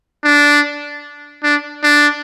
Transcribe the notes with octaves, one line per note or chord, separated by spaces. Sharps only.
D4
D4
D4